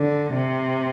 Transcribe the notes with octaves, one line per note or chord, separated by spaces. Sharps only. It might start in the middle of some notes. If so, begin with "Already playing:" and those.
Already playing: D3
C3